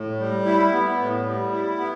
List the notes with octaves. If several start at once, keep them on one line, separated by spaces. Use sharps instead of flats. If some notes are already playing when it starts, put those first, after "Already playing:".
Already playing: A2
G3
E4
B3
A2
G3
E4
B3